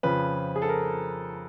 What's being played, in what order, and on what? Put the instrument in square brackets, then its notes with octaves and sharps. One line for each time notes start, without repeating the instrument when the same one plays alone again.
[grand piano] F2 C#3 F3 B4
G#4
A4
A#4